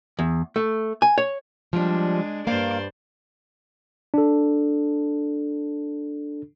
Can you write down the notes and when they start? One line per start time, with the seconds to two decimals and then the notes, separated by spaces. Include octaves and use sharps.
0.19 E2
0.56 A3
1.02 G#5
1.18 C#5
1.73 F3 G3 G#3 D4
2.47 G2 A#3 C5 D5 F5
4.14 D4 A4